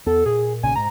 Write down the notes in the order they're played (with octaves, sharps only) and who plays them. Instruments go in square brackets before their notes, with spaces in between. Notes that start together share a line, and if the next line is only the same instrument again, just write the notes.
[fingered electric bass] E2 B3 [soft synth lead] A4
[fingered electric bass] A#2 [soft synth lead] G#4
[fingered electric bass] B1 A#2 C#3 [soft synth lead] G#5
[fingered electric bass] G#2 [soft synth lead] A#5